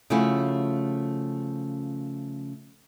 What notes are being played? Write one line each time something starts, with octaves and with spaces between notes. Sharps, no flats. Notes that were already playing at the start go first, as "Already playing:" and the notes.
C#3 F3 A3 C#4 E4 F#4